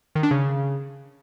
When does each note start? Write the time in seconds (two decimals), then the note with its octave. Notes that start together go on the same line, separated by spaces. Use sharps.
0.15 D#3
0.23 D4
0.31 C#3